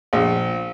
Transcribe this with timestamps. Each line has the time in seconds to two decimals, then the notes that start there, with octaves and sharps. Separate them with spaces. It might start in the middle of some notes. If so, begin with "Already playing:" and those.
0.13 A#1